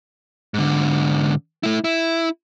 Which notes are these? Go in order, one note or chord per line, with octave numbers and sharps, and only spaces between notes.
G#2 D3
A3 E4
E4